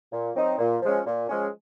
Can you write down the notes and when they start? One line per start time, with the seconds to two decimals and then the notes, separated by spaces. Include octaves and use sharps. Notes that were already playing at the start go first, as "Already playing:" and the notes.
0.12 A#2
0.35 F#3 C4 D#4
0.58 A#2
0.82 F3 G#3 C#4
1.06 A#2
1.29 F3 G#3 C#4